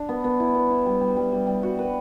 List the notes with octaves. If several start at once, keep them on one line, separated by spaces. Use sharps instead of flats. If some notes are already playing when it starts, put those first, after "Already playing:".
Already playing: D4
B3
B3
E4
B3
E4
G3
G3
G3
G3
G3
F#4
B4